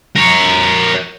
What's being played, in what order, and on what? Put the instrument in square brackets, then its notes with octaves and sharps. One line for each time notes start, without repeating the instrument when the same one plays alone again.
[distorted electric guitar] A#4 C#5